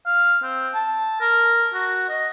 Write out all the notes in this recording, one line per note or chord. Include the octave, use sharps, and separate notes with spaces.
F5
C4
A5
A#4
F#4
D#5